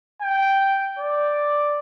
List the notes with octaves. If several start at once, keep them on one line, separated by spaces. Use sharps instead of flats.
G5
D5